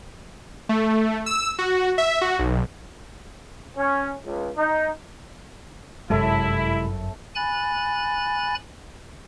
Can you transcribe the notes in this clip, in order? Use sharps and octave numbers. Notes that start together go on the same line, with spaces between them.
A3
E6
F#4
E5
F#4
B1
C#4
C#2
D#4
G1 F#2 C3 G#3 E4 A4 C#5 E5
G#5 B5 F#6 A6